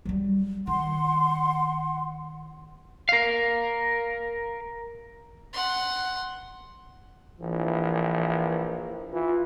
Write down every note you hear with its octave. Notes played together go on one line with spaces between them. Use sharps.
F#3 G3
D#3 F#5 C6
A#4 F5
F#5 C6
A#1 E3
E3 F4